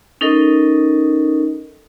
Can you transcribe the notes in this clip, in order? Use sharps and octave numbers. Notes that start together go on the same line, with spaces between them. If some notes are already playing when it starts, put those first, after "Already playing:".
C#4 D#4 A4 A#4 D#5